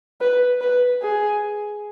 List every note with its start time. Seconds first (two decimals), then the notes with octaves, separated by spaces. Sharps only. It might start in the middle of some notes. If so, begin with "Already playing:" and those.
0.21 B4
0.61 B4
1.02 G#4